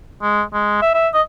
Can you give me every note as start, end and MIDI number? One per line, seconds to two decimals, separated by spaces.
0.22 0.42 56
0.54 0.78 56
0.82 0.92 76
0.94 1.08 76
1.14 1.22 75